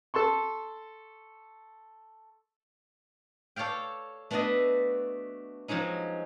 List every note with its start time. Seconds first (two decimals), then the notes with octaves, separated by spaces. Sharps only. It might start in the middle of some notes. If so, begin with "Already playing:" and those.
0.14 A4 A5 C6 C#6
3.56 A4 C#5 D5 F5 G5
4.31 A3 B3 D4 F#4 D#5 E5
5.68 F3 F#3 G#3 C#4 D#4